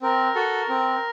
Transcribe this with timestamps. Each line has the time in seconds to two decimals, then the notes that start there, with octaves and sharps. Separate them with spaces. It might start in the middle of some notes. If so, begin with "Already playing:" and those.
0.02 C4 A#4
0.35 F#4 A4
0.69 C4